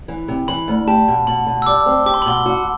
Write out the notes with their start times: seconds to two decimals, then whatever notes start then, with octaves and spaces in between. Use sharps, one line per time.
0.08 E3
0.28 C3
0.48 E3 B5
0.68 D2
0.87 G4 A5
1.08 B2
1.27 B2 B5
1.47 B2
1.62 E6
1.66 G3 D6
1.86 C4
2.06 G4 D6
2.14 C6
2.22 B5
2.26 B2 C6
2.46 F#4